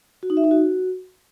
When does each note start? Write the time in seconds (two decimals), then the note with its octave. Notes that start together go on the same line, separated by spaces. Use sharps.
0.23 F#4
0.30 D#4
0.37 E5
0.44 D#4
0.51 F#4